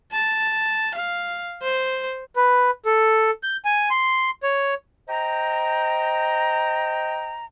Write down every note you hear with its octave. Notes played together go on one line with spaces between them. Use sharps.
A5
F5
C5
B4
A4
G6
G#5
C6
C#5
C5 D#5 G5 A#5